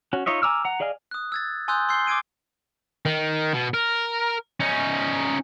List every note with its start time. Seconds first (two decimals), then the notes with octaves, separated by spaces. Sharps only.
0.13 C#4 F#4
0.26 D#4 F4 C#5 D#5 E5
0.42 G#5 A#5 D6 E6 F6
0.65 F#5 A#5
0.80 G#4 D5 D#5 F5 G#5
1.11 D#6 F#6
1.32 E6 G#6 A6
1.68 G#5 C6 D#6 E6 F#6 G6
1.89 C6 E6 G6 C7 G7
2.07 D6 E6 G#6 D7 D#7
3.06 D#3
3.54 B2
3.74 A#4
4.60 C#4 D#4